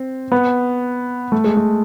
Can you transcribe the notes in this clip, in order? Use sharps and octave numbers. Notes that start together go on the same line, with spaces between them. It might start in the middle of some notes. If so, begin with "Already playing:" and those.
Already playing: C4
B3
A3
G#3
A3